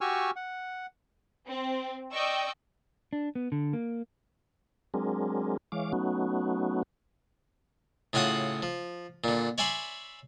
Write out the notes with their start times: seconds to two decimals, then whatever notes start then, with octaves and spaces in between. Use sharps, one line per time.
0.01 F#4 G4 G#5 C#6 E6 F6
0.36 F#5
1.49 C4
2.12 D5 D#5 G5 C#6 E6
3.13 D4
3.35 B3
3.52 D3
3.73 A#3
4.94 F#3 G#3 C4 D4 G#4 A#4
5.72 E3 G#3 C#5 F5 D6
5.93 F#3 A3 B3 C#4 D#4 F#4
8.13 A2 C#3 F4 F#4 F#5 D#6
8.62 F3
9.24 A#2 D3
9.58 C#5 D5 E5 G#5 B5 C6